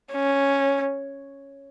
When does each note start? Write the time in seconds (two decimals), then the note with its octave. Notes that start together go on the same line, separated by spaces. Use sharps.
0.13 C#4